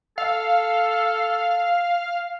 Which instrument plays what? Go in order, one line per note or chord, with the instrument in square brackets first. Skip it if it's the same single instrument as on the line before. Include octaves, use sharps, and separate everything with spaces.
[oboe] A4 [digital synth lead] F5